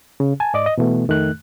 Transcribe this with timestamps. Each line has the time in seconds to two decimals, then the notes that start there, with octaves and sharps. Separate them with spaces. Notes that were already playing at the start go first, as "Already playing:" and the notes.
0.20 C#3
0.40 G#5 A5
0.54 G#2 D5 D#5 D6
0.66 D#5
0.78 B2 E3 A3 B3
1.08 F2 D#3 A3 F#6